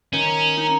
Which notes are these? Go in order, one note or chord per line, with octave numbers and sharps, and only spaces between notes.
D#3 C#4
D#4